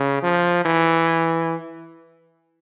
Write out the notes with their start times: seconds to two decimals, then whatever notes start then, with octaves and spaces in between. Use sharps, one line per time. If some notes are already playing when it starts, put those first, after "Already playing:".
Already playing: C#3
0.23 F3
0.65 E3